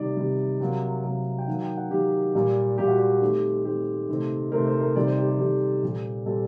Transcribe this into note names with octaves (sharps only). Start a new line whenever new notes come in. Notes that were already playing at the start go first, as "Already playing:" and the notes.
Already playing: C3 D#3 G3 D5
C3 D#3 G3
C3 F#3 A#3
C3 F#3 A#3
G5
D#3 F#3 A#3 F#5
G5
F#5
D#3 F#3 A#3 G4
A#2 G3 A#3
A#2 G3 A#3 G4
F#4
G4
D#3 A3 C4
D#3 A3 C4 G4
C3 D#3 A3 C4
C3 D#3 A3 C4 A#4
C5
A#4
C3 D#3 G3 D5
C5
G4
G4
C3 D#3 G3 A4
A#2 G3 C4
A#2 G3 C4 A4